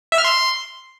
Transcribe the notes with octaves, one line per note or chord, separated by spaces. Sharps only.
E5
F6
C6